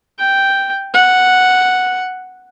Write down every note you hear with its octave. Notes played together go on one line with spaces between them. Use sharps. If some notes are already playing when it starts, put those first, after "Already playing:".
G5
F#5